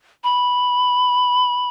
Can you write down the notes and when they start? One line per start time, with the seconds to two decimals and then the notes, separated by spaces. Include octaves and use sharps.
0.24 B5